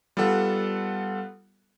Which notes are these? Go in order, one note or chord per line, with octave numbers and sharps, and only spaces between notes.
G3 B3 F4 A4 F#5